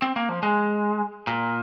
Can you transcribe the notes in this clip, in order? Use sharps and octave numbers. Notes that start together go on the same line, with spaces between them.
C4
A#3
F3
G#3
A#2